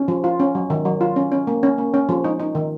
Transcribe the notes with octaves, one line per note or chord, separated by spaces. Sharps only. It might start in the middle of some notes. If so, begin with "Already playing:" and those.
Already playing: C#4
F3
F4
C#4
F#3
D#3
F#3
F4
C#4
C#4
A#3
C#4
A#3
C#4
F3
D#4
D#4
D#3